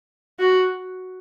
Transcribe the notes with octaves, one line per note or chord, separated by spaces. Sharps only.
F#4